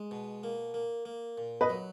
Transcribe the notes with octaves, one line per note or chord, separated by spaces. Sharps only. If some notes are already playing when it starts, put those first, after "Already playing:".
Already playing: G#3
B2
A#3
A#3
A#3
A#2
B4 D#5
F#3